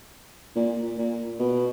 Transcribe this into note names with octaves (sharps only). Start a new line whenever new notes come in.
A#2
A#2
B2